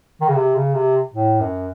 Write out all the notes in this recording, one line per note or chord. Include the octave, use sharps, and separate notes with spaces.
D#3
C#3
C3
C#3
C3
A2
F#2